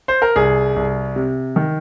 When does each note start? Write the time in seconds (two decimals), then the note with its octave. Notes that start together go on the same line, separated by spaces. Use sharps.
0.08 C5
0.22 A#4
0.36 C2 G#4
0.76 C2
1.16 C3
1.56 D#3